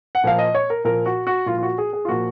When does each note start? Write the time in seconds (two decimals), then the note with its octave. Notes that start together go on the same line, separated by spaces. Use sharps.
0.15 F#5
0.24 A#2 F3 A#3 F5
0.38 D#5
0.55 C#5
0.70 A#4
0.84 A#2 F3 A#3 A#4
1.06 F#4
1.27 F#4
1.46 A#2 F3 A#3 F4
1.58 F4
1.63 F#4
1.78 G#4
1.93 G#4
2.05 F4
2.08 A#2 F3 A#3 F#4